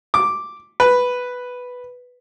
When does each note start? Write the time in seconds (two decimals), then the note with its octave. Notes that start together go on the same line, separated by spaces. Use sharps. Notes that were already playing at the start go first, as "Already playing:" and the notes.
0.14 D6
0.80 B4